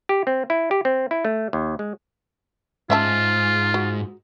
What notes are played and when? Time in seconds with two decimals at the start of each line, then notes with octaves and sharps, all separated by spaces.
0.09 G4
0.27 C4
0.50 E4
0.71 G4
0.85 C4
1.11 E4
1.25 A3
1.53 D#2
1.79 G#3
2.90 G#2 C#4 F4 E5 A5
3.74 F#4